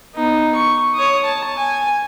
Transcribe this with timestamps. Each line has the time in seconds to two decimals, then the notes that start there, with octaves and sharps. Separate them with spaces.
0.15 B3 D#4
0.55 C#6
0.94 C#5 D#6
1.24 A5
1.57 G#5